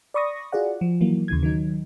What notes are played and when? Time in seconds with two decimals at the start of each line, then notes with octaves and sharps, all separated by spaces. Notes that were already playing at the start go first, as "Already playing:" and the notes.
0.14 D5 B5 C#6 D#6 A#6
0.52 F4 F#4 G#4 D5 F#5
0.81 F3
1.01 E3 F#3 A#3
1.28 D#2 C#3 E3 G#6
1.43 D#3 F#3 D#4